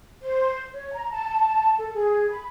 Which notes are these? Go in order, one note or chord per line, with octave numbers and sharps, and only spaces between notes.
C5
C#5
A#5
A5
A4
G#4
B5